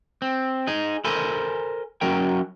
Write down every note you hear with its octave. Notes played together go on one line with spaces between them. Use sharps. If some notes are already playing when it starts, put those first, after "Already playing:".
C4
D#4 G#4
A4 A#4 C5 G#5 B5
F#3 C#4 A#4 G5